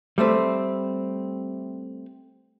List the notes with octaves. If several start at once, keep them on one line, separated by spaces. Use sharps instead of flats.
G3 A3 C4 B4